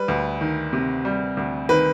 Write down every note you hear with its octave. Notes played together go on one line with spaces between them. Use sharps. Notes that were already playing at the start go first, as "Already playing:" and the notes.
Already playing: G3 B4
D2
D#3
C3
G3
D2
D#3 B4